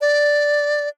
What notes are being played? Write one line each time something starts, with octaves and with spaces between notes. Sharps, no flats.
D5